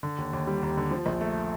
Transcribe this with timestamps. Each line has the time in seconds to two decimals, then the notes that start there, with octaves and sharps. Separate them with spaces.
0.03 D3
0.18 D#2
0.33 D#2
0.47 G3
0.63 D#2
0.77 D3
0.91 F3
1.06 A#1
1.21 A3